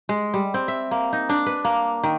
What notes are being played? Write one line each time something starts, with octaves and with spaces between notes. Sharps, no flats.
G#3
G3
C4
E5
A#3
D#4
D4
B4
A#3
D#3